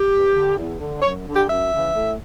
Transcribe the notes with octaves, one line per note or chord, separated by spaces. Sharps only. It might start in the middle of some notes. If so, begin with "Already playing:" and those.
Already playing: G4
G2
D3
E2
D3
F#2 C#5
D3
G4
F#2 E5
C#3 E3
A2